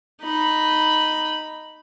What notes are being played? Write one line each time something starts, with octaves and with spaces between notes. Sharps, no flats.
D#4 B5